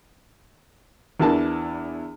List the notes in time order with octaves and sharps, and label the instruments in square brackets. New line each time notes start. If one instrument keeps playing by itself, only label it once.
[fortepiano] E2 E3 D4 A#4 A5